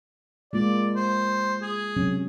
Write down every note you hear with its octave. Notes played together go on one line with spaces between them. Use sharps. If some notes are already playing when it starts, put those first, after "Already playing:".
G#3 A#3 F4 D5
C5
G#4
C3 F#3 C#4